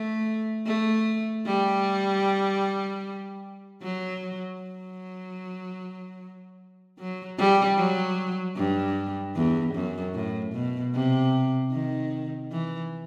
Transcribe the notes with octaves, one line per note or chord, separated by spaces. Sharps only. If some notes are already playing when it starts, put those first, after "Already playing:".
Already playing: A3
A3
G3
F#3
F#3
F#3
G3
F#3
G2
E2
F#2
A2
B2
C3
D#3
E3